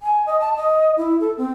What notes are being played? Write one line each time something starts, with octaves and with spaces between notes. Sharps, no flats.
G#5
D#5
A5
D#5
E4
A4
C4